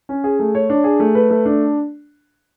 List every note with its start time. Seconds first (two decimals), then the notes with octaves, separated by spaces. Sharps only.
0.09 C#4
0.24 G#4
0.39 A3
0.55 C#5
0.70 D4
0.84 G#4
1.00 A3
1.15 B4
1.30 A3
1.45 D4